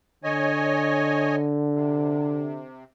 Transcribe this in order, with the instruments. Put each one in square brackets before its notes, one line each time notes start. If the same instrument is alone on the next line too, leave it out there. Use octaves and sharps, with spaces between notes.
[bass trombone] D3 [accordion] C#5 D#5 G#5
[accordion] C3